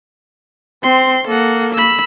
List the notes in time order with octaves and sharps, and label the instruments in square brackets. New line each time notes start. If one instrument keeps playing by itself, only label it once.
[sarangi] C4 [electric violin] C6
[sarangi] A#3 [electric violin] A4 F#5
[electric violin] B5 E6